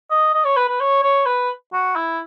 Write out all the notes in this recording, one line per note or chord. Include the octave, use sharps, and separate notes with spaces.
D#5
D#5
C#5
B4
B4
C#5
C#5
B4
F#4
E4